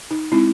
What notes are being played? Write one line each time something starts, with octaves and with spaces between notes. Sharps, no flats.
D#4
G#3 C4 D#4 E4